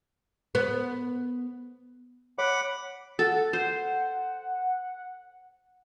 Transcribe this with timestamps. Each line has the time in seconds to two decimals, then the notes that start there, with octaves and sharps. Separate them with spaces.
0.55 B3
2.38 C#5 F#5 B5 D6
3.19 A4 F#5
3.53 C5